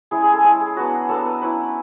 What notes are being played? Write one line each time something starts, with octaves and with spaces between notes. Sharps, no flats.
G#3 C#4 E4 G#4
G#4
A4
G#3 C#4 E4 G#4
G#4
F#3 B3 D4 F#4
G#4
F#3 B3 D4 A4
B4
F#3 C#4 E4 B4